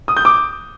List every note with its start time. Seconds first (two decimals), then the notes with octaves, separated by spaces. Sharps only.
0.08 D#6
0.17 G6
0.25 D6